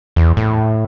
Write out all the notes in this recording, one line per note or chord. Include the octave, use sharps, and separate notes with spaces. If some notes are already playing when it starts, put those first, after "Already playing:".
E2
A2